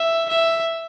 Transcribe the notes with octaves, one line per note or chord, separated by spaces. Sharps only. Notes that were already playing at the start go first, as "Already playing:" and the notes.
Already playing: E5
E5